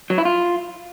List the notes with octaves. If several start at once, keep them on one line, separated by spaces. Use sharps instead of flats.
F#3
E4
F4